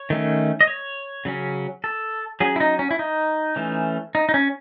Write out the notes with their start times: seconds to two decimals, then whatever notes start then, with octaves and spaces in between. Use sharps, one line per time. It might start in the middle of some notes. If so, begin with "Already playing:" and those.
Already playing: C#5
0.10 D#3 A3 C#4
0.61 D#5
0.68 C#5
1.25 C#3 F#3 C#4
1.84 A4
2.40 F#3 C#4 G#4
2.56 E4
2.60 D#4
2.79 C#4
2.91 E4
2.99 D#4
3.56 E3 A3 C#4
4.15 D#4
4.29 D#4
4.34 C#4